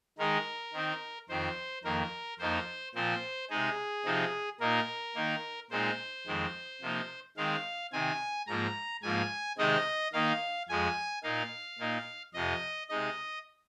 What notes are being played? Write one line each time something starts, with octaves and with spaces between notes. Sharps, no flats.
D#3 G#3 D#4 A#4
D#3 C4 D#4
F2 D#3 C4 C5
F2 D#3 A#3 A#4
F2 F3 A#3 D#4 C5
A#2 F3 C4 C5
C3 G#3 D#4 G#4
C3 F3 C4 D#4
A#2 A#3 D#4 A#4
D#3 A#3 D#4
A#2 G#3 C4 D#4 C5
F2 D#3 G#3 C4
C3 F3 A#3 D#4
D#3 G#3 C4 F5
C3 D#3 C4 G#5
G#2 F3 A#3 A#5
G#2 F3 A#3 G#5
C3 D#3 G#3 C4 D#4 D#5
D#3 A#3 D#4 F5
F2 F3 G#3 G#5
A#2 A#3 D#4 F5
A#2 A#3 D#4
F2 C3 F3 D#5
C3 G#3 D#4 D#5